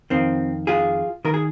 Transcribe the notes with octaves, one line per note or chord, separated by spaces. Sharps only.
F2 D#3 C4
F4 G#4
D#3 A#4
G#4